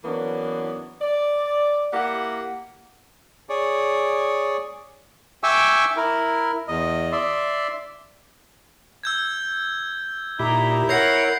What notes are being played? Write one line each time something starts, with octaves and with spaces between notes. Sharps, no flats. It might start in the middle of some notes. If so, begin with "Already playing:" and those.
E3 F#3 A#3 B3 C#4 D4
D5
A#3 E4 G4 F#5
G#4 C#5 D5
E5 G5 G#5 C#6 D6 E6
E4 A#4
E2 D#5
D5 E5 C6
E6 G6 G#6
A#2 D#4 E4 G4 A#5
A#4 C#5 F#5 G6 A#6 C7